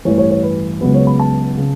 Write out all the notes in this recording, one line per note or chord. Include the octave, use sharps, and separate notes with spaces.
A1 G2 E3 C#5
C#5
C#5
B4
C#2 C#3 F#3 B3 B4
C#5
B5
A5
C#3